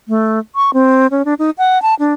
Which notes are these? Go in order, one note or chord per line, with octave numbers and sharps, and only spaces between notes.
A3
C#6
C4
C#4
D4
D#4
F#5
A5
D4